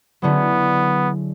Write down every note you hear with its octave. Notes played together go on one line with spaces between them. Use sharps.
D3 F#3 B3 C#4 E4 G#4